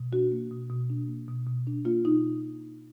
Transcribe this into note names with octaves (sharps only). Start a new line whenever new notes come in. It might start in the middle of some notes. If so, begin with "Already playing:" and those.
Already playing: B2
D4 F#4
A#3
B2
B2
D4
A#3
B2
B2
D4
A#3 F4
B2 D#4